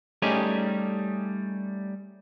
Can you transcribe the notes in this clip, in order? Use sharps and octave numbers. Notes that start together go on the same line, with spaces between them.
G3 A3 C#4 D#4 G4 G#4